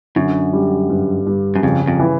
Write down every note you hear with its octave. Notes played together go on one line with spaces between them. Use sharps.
F#2 D3
G3
G2
G2
F#2
F2 C#3
F2
E3